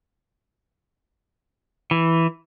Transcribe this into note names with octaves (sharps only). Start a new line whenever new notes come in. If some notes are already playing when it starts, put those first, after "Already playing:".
E3